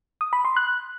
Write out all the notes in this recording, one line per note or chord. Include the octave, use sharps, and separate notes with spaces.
D#6
B5
C6
F#6